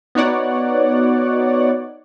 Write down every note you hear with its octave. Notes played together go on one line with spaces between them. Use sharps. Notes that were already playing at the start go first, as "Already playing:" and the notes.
B3 D#4 F#4 C#5 D5 F#5